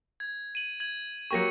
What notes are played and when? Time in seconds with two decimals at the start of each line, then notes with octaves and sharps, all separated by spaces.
0.20 G#6
0.55 D#7 F#7
0.80 G#6 F#7
1.31 F#3 A#3 G4 C#6 A#6 C#7